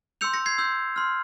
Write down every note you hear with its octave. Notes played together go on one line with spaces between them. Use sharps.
C6 E6 G6 C#7 F7
A#6 C#7
G#6 C7
C6 E6 G6
C6 F6